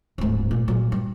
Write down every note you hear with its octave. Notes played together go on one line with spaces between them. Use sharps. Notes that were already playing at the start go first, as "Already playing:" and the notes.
D1 G#2
A#2
A#2 F#3
G2